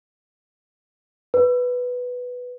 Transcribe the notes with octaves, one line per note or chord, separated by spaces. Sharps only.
B4